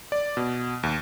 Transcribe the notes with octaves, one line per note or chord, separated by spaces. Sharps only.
D5
B2
D#2